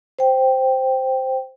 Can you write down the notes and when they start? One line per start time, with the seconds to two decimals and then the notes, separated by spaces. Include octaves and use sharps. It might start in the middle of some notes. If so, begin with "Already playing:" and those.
0.19 C5 G5